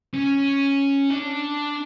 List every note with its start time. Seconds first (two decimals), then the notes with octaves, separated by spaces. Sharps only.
0.14 C#4
1.10 D4